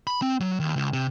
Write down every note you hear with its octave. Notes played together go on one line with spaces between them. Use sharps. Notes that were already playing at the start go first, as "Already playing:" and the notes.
B5
C4
F#3
D#2
C#2
C3